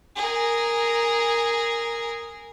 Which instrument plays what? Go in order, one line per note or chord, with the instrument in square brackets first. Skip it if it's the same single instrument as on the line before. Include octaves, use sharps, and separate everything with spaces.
[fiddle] G#4 A#4